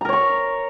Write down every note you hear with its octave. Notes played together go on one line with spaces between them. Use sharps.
A#4 C#5 A#5 C#6